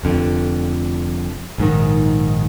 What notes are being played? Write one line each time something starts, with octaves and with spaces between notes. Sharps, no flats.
F1 F2 D3
A#1 G#2 D#3